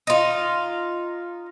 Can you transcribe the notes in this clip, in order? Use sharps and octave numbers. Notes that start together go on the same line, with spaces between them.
D#4 F4